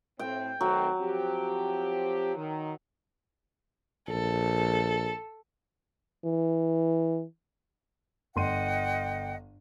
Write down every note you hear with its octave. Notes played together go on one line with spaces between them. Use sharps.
A2 C4 G5
D#3 F#3 A3 C4
F3 C4 G4
D#3
A#1 A4
E3
G1 D#5 F#5 G5 C6 D#7